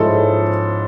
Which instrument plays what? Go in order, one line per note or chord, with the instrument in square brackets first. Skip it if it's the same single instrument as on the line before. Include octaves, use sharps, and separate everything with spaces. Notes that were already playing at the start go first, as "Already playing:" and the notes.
Already playing: [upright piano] G#2 F3 G#3 C#4 E4 A4